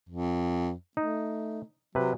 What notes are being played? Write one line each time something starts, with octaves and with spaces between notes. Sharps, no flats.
F2
A3 D#4
C3 F#3 B4